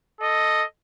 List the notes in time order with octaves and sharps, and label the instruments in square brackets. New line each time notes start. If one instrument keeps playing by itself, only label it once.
[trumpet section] A4 D#5